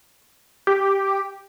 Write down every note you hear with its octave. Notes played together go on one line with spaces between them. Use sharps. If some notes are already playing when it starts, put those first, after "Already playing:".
G4